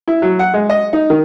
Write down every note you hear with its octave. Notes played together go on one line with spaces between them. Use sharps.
E4
F#3
F#5
G#3
D#5
D#4
D#3